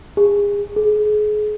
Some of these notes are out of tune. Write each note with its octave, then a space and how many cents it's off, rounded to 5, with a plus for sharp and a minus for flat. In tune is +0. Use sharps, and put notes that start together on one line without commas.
G#4 -35
G#4 +30